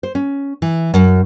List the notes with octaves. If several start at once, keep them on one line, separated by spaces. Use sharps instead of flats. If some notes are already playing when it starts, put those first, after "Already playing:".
C5
C#4
E3
F#2